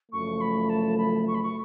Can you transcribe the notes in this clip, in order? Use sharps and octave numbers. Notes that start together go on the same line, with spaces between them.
F#1 F#2 F3 A3 C#6
B5
A5
B5
C#6
B5
C#6